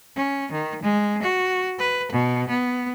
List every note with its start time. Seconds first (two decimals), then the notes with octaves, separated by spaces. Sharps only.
0.16 C#4
0.52 D#3
0.82 G#3
1.23 F#4
1.79 B4
2.12 B2
2.49 B3